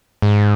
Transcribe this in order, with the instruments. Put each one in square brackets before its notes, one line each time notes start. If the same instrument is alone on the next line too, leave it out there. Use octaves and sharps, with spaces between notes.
[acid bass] G#2